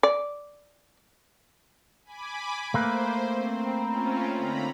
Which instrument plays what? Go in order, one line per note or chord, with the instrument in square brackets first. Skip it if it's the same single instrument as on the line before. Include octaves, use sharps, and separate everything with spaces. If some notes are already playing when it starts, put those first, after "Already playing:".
[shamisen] D5
[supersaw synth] G#5 B5 D6
[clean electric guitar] A3 A#3 B4 [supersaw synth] C5
[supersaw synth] C4
C4 C#4 F4
D3 A#5 B5